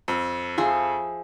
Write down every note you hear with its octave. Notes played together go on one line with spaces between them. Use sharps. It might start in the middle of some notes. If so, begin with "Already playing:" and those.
F2
F3 G#4 E5